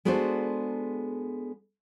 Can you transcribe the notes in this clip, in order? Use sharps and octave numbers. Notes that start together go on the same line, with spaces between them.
G#3 B3 D4 F#4 A4 C5